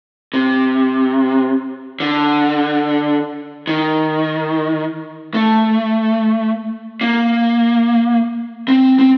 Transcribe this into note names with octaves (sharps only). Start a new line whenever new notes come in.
C3
D3
D#3
A3
A#3
C4
C4